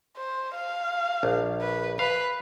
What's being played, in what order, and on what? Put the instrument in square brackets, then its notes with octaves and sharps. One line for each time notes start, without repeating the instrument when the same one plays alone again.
[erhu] C5
F5
[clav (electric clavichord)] A#1
[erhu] B4
[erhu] B4 [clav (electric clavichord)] F5